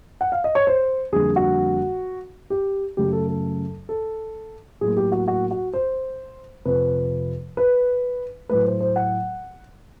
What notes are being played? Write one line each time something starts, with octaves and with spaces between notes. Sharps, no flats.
F#5
F5
D#5
C#5
C5
F2 D3 G3 A#3 G#4
F#4
G4
F#2 C#3 F#3 A3 G4
A4
A4
A4
A2 F#3 A#3 G#4
G4
F#4
F#4
F#4
C5
F2 C3 F3 B4
B4
A2 F#3 A3 B4
C5
C5
F#5